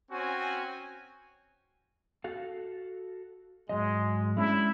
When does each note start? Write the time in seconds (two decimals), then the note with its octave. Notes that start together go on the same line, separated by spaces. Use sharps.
0.11 C4 C#4 F#4 G#5
2.24 F#4 A4 F5
3.69 G#2 F#3 G#3 D#5
4.37 G#3 C#4 D4 E4